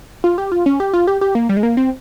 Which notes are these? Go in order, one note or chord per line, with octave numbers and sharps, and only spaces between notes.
F4
G4
F4
C#4
G4
F4
G4
G4
A#3
G3
G#3
A#3
C4